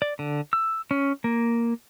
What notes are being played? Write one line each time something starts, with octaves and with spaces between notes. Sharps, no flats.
D5
D3
E6
C#4
A#3